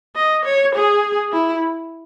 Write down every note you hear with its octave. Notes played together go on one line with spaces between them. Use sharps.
D#5
C#5
G#4
E4